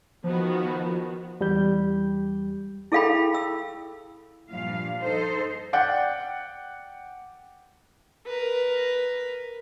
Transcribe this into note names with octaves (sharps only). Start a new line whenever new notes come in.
D#3 F3 B3 F#4
E2 G3 G4 G6
E4 G#4 A4 F5 G5 B5
E6
G2 A#2 F3 F5
D#4 A4 C5
D5 F#5 G5 G6
A#4 B4